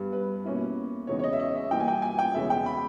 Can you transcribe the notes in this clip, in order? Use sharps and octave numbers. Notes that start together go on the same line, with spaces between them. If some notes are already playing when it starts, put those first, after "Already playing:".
Already playing: G2 G3 B3
B4
B2 A#3 C#4 E4
E2 C#3 G#3 D#4 C#5
C#5
D#5
E5
D#5
E5
G2 E3 A#3 G5
G#5
G5
G#5
G5
E2 C#3 G#3 C#4 E4 E5
G5
B5